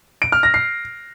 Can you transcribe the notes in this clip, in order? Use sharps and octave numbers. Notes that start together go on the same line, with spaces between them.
D7
F6
A#6
C7